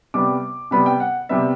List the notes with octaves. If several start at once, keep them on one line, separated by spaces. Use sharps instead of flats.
C3 G3 B3 D6
C3 G3 B3 B5
G5
F#5
C3 G3 B3 E5